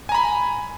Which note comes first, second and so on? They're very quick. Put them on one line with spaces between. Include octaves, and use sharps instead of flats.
G#5 A#5 B5